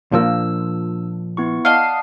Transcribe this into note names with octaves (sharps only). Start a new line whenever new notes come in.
A#2 F3 A#3 D4 E6
B3 E4 C#6
D5 D#5 F5 F#5 A5